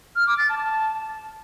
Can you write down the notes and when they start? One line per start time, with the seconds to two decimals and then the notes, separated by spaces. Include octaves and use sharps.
0.16 F6
0.27 D6
0.38 A6
0.49 A5